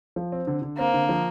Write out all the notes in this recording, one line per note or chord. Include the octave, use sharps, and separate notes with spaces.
F3
C4
D3
D3
A#3 C4
D3
F3